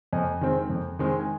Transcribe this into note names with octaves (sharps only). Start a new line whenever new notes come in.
F2 D#5 G#5
D#3 G#3 C4
F2
D#3 G#3 C4
G#5